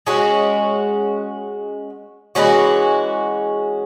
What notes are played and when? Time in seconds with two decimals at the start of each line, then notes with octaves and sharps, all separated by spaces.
0.07 G#3 C#4 F#4
2.35 E3 G#3 C#4 F#4